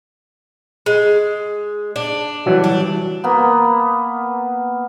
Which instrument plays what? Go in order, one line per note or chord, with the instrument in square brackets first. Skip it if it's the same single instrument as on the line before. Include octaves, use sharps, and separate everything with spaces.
[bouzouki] G#3
D4
[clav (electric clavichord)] E3 F#3 G3
[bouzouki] D4
[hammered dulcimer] A#3 B3